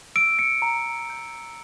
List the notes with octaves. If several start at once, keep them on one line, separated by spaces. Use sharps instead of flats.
E6 D7
C#7
A#5
G6